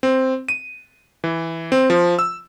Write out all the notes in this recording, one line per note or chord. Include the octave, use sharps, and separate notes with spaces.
C4
D#7
E3
C4
F3
E6